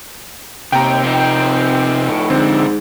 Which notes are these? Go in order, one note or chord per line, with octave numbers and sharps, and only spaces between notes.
D#2 C3 G5 A#5
F3 C4 D#4
A2
G#2 D3 C4